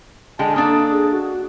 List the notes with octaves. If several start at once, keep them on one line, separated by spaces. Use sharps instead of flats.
D3 G#3 G5 A5
A#3 D4 A4 D#6
G#4
F#4